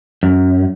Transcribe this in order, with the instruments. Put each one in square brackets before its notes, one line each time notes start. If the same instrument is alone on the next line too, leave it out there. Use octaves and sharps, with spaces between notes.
[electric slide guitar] F#2